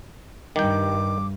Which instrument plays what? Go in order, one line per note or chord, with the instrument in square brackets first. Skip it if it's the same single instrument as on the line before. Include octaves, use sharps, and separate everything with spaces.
[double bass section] G2 [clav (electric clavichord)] D#3 G5 [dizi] D6